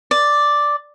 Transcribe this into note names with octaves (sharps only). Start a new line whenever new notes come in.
D5